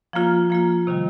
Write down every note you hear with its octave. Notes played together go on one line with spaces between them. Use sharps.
F3 A#3 F4
F3 A#3 F4
C3 D#3 G3